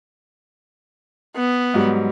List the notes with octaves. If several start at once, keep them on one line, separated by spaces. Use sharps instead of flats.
B3
G#2 F#3 G3